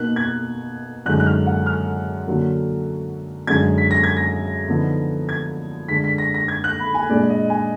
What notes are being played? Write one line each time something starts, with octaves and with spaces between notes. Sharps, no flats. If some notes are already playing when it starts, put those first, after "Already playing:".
Already playing: B2 A#3 D#4 F#6
G#6
F#2 D3 G#3 D#4 F#6
F#6
F6
F#5
F6
D3 F#3 A#3
F#2 D3 G#3 D4 G#6
B6
A#6
G#6
A#6
D3 F3 B3 D#4
G#6
D3 G#3 D4 B6
B6
A#6
A#6
G#6
F#6
B5
G#5
A#2 G#3 D4 D5
D5
D#5
G#5